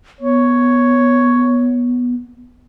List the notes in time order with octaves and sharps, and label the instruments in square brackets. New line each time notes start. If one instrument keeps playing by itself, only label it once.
[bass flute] B3 [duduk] C#5